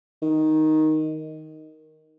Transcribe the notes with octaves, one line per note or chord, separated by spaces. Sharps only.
D#3